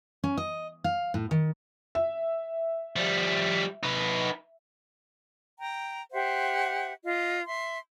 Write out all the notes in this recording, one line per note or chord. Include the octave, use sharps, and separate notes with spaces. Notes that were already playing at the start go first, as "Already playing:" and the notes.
C#4
D#5
F5
A2
D#3
E5
F3 G3
D#4 B4
G5 A#5
G4 C5 E5 F#5
F4 D#5
E5 C6